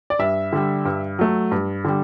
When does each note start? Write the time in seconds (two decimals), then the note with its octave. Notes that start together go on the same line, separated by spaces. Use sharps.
0.10 D5
0.19 G2 E5
0.53 D3 G3
0.85 G2
1.19 F#3 A3
1.51 G2
1.85 D3 G3